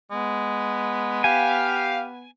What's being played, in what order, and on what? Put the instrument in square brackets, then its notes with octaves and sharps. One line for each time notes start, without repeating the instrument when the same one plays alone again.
[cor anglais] G#3 [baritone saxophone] B3
[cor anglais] G4 [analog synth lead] F5 [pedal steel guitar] G#5